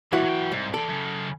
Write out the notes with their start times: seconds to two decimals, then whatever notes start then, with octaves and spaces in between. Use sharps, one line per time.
0.12 A#2 E3 G3 E4 F#4
0.25 F#3 G5
0.52 C2 G#2
0.74 E3 A4 D5
0.89 F#2 C#3